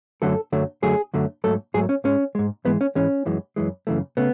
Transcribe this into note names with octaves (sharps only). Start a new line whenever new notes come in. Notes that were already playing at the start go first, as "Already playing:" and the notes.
F#2 D3 F#3 A3 A4
F#2 D3 F#3 A3
F#2 D3 F#3 A3 G#4
F#2 D3 F#3 A3
G#2 F#3 A3 A4
G#2 F#3 A3 G#4
C#4
G#2 G#3 C#4
G#2 G#3
G#2 E3 G#3 B3
C#4
G#2 E3 G#3 C#4
F#2 E3 G#3
F#2 E3 G#3
F#2 C#3 E3 A3
C#3 A3 B3